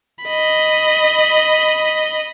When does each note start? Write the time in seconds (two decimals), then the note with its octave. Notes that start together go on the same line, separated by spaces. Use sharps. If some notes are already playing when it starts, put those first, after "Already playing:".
0.25 D#5 B5